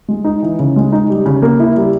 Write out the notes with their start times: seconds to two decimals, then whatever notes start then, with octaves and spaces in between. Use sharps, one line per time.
0.08 G#3
0.24 D#4
0.42 E3
0.59 C#3
0.76 G#3
0.92 D#4
1.10 G3
1.26 C#3
1.42 A#3
1.60 E4
1.77 G3